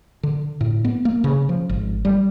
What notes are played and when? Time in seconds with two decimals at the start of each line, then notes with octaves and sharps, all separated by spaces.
0.23 D3
0.61 A2
0.85 B3
1.05 A#3
1.24 C#3
1.49 F3
1.69 G#1
2.05 G3